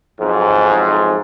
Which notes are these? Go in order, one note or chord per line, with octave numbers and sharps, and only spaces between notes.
B1 F2 G#2